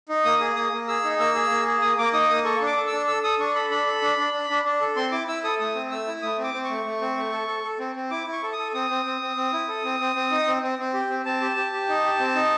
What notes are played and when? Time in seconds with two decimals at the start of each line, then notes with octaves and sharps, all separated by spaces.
0.09 D#4
0.25 A#3 D#6
0.40 G#4
0.56 A#3 D#6
0.72 A#3
0.88 G#4 E6
1.04 D#4
1.19 A#3 E6
1.35 G#4
1.51 A#3
1.66 G#4
1.82 A#3 D#6
1.98 A#3 D6
2.13 D#4 D#6
2.29 A#3 D#6
2.45 A4 C#6
2.61 D4
2.67 D6
2.77 A4
2.87 E6
2.92 D4
3.07 A4 E6
3.24 A4 D#6
3.39 D4 C#6
3.55 A4 B5
3.70 D4 B5
3.87 A4
4.02 D4
4.18 D4
4.34 D4
4.50 D4
4.65 D4
4.81 A4
4.96 C4 C6
5.12 E4 D6
5.28 E4 E6
5.44 A4 D#6
5.60 A3 D#6
5.75 C4
5.91 A3 E6
6.07 E4
6.22 A3 D#6
6.38 C4
6.44 D6
6.54 C4
6.65 A3 C#6
6.85 A3
7.01 C4
7.17 A3
7.32 A4
7.48 A4
7.64 A4
7.79 C4
7.96 C4
8.11 E4 D6
8.27 E4
8.32 C#6
8.43 A4
8.53 A4 D#6
8.74 C4 D#6
8.90 C4
9.05 C4
9.21 C4
9.36 C4
9.53 E4
9.68 A4
9.84 C4
10.00 C4
10.16 C4
10.31 D#4
10.47 C4
10.63 C4
10.79 C4
10.93 G4
11.10 C4
11.25 C4 A5
11.41 G4
11.57 G4
11.72 G4
11.89 D#4
12.04 G4
12.20 C4
12.35 D#4